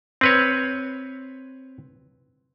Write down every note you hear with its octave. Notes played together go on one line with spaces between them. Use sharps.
C4 B4 C#5